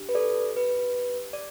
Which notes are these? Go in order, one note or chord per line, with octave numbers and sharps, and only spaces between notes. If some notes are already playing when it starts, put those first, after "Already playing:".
Already playing: D4 G4
B4
A4 D5
B4
D5